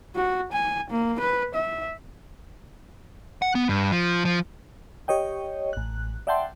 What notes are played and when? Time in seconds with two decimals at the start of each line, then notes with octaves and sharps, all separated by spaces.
0.15 F#4
0.53 G#5
0.90 A#3
1.20 B4
1.55 E5
3.42 F#5
3.55 B3
3.69 G2
3.92 F3
4.25 F3
5.08 G4 C#5 D#5 G5
5.73 A1 F#6
6.27 D5 E5 F#5 G5 A5 C6